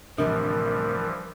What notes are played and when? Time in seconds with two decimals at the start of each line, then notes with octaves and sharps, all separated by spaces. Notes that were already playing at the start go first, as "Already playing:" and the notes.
0.18 A1 D2 C3 E3 F3 G3 D4 A#4